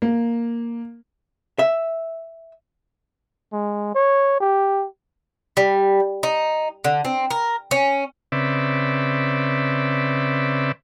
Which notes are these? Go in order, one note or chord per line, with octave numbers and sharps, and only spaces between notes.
A#3
E5
G#3
C#5
G4
G3
D#4
D3
C4
A#4
C#4
C#3 C4 B4 D5 E5